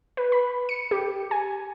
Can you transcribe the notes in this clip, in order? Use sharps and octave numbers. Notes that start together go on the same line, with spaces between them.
B4
B5
C#7
G4
G#5